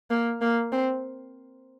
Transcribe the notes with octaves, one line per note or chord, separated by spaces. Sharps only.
A#3
A#3
C4